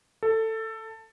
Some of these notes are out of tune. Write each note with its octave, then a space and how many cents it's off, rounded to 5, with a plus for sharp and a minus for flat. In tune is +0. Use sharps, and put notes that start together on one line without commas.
A4 +15